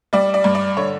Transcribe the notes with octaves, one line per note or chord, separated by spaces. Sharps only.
G3 D5
D5
G2
D5
D3 C#5